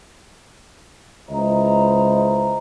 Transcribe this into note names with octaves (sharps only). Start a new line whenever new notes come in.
C#2 E4 C5 D#5 A#5